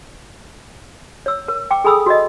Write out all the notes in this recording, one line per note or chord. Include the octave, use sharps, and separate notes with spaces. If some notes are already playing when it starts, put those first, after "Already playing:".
C#5 E6
A#4
G5 D6
G#4 A4 G#5 B5 D#6 E6
F#4 D5 D#5